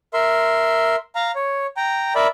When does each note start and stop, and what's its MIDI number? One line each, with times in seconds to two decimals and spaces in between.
0.14 0.96 70
0.14 0.96 76
0.14 0.96 84
1.15 1.31 77
1.15 1.31 82
1.35 1.67 73
1.77 2.14 79
1.77 2.14 82
2.15 2.27 70
2.15 2.27 74
2.15 2.27 76
2.15 2.27 83